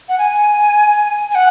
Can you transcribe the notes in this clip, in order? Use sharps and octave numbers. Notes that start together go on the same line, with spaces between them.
F#5
G#5
G#5
F#5